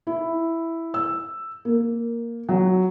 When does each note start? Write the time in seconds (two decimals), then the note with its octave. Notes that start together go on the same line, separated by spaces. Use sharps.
0.07 E4
0.94 E6
1.65 A#3
2.49 F#3